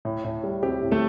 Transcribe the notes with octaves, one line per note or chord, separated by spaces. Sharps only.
A2
A2
G3
C4 G4
A2
A3 A4